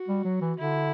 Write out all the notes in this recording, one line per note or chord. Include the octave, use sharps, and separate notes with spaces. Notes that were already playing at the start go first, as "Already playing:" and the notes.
Already playing: F#4
G3
F#3
E3
D3 E4